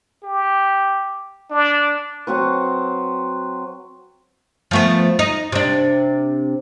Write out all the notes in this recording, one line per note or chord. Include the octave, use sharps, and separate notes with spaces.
G4
D4
F#3 C4 F#4 B4
F3 A3 B3
D#4
C3 D4